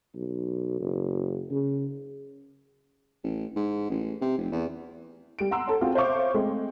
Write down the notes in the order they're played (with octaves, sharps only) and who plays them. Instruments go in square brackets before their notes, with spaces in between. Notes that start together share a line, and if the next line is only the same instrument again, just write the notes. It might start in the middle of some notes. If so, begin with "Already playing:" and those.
[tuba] B1
F#1
C#3
[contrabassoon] A1
G#2
A1
C3
F1
E2
[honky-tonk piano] G3 D7
F#5 A#5 C6 E6
A4 C#5
C4 F4 F#4 G#4
C5 C#5 E5 F5 C#6 D6
G#3 A3 C4